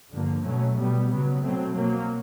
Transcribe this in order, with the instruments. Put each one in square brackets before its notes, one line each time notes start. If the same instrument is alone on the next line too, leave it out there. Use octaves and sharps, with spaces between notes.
[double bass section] G2 D3 F3 A#3
B2 F#3 A3 C#4
B2 G3 B3
C#3 F#3 B3
B2 F#3 A3 C4
B2 F#3 A#3